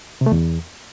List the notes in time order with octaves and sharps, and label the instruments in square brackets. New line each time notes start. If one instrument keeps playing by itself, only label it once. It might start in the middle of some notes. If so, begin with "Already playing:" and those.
[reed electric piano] C3
A3
E2